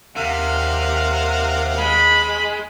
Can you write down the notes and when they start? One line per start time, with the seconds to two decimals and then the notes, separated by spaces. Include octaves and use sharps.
0.16 D#2 C3 D#3 A#4 F5 F#5
1.79 G#3 B5